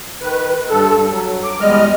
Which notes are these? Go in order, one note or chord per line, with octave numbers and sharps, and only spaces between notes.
D#3 B4
G2 A4
F#3
D6
E2 G3 G#3 D#5 F6